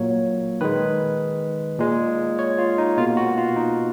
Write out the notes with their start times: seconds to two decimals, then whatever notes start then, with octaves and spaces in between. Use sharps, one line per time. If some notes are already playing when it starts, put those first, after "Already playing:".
Already playing: A#2 F#3 A#3 C#5
0.61 D#3 G#3 B4
1.79 A#2 G#3
2.39 C#5
2.58 F4
2.78 D#4
2.98 B2 A#3 F4
3.17 F#4
3.38 F4
3.56 D#4